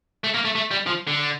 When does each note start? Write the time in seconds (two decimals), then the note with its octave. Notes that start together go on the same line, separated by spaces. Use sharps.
0.24 A3
0.34 A#3
0.45 A3
0.55 A3
0.71 G3
0.86 F3
1.07 D3